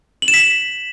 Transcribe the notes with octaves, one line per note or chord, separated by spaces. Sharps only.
F#7
E7
B6